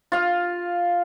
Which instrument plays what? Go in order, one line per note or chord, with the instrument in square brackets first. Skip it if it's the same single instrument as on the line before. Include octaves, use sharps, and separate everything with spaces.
[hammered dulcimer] F4 F5